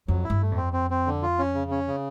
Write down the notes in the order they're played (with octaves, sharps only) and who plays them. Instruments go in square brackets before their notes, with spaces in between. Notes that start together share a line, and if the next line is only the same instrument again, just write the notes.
[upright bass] F2 [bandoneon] F#3
[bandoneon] E4
[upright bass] G2
[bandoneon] A3
[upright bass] F2
[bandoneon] C4
C4
C4
D3
F4
C#4
C#3
C#4
C#3